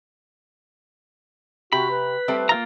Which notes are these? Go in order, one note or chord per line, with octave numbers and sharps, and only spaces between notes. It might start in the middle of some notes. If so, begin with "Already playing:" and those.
C3 F#4 G4 B5
B4
G3 A3 C4
A#3 F4 A#5